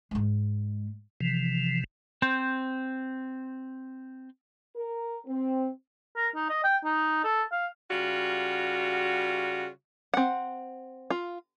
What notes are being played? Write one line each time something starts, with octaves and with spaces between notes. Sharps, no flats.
G#2 G#3
C3 E3 F3
C4 C5
A#4
C4
A#4
D#4
D#5
G5
D#4
A4
F5
C#3 G3 F4 F#4
C4 F#5
F4